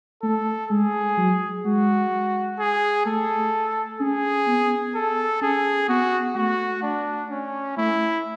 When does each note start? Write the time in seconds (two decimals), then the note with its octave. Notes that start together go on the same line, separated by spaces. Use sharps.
0.23 A3 A4
0.71 G#3 G#4
1.17 F#3
1.65 G#3 F#4
2.59 G#4
3.06 A3 A4
4.00 C#4 G#4
4.47 B3
4.95 A4
5.42 C#4 G#4
5.89 B3 F#4
6.35 A3 F#4
6.83 D4
7.30 C#4
7.77 A3 E4